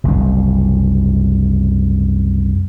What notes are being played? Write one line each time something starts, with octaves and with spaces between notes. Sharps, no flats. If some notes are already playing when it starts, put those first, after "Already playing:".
F#1 C2